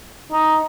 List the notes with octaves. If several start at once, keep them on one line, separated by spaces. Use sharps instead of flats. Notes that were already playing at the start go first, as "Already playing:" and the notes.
D#4